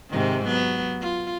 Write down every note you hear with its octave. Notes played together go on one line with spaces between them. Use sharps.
G#2 C3 D#3
F#3 B3
F4